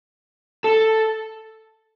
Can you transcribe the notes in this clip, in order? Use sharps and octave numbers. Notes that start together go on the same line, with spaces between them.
A4